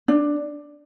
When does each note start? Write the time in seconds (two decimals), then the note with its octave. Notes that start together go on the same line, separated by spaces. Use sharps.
0.08 D4